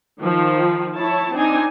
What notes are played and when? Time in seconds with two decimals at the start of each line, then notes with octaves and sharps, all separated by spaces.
0.20 D#3 F3
0.95 E4 C#5 A5
1.34 C4 D4 D#4 G#5